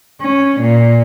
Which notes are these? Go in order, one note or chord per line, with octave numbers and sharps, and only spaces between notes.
C#4
A#2